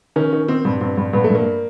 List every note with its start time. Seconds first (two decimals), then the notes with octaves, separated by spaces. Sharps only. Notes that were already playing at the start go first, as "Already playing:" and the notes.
0.16 D#3 C#4
0.33 D#3
0.48 D#3 C4
0.65 G2
0.81 G2 C4
0.97 G2
1.13 G2 B3
1.24 A3
1.30 G2
1.35 A#3